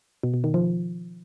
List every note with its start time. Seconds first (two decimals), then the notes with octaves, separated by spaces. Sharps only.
0.23 B2
0.34 B2
0.44 D#3
0.54 F3